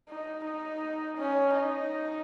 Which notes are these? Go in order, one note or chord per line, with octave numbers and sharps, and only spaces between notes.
D#4
D#4
C#4
D#4